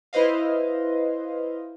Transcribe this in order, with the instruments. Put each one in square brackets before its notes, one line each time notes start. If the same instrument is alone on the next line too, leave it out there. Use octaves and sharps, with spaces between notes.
[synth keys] E4 B4 C5 D#5 F5